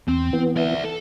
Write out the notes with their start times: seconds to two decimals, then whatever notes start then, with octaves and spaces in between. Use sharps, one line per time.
0.08 E2 C4
0.33 E3 B3
0.57 D5 E5
0.84 A4